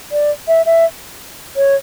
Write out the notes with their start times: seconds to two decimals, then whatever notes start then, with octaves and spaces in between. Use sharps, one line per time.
0.12 D5
0.48 E5
0.66 E5
1.56 C#5